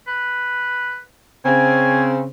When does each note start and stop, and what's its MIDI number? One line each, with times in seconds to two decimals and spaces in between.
0.07 1.00 71
1.45 2.28 49
1.45 2.28 60
1.45 2.05 80